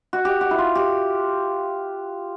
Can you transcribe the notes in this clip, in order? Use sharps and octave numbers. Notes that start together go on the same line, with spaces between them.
F#4
G4
F#4
E4
F4
G4